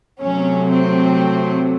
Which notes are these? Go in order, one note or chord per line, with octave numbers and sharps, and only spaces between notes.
C3 F#3 A3 C#4
C4